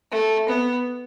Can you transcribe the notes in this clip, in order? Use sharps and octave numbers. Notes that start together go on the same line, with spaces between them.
A3
B3